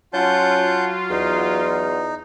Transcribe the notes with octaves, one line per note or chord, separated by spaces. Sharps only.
F#3 C#4 F4 F#5 A5 G6
E2 D#4